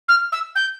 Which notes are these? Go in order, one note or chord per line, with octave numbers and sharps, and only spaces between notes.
F6
E6
G6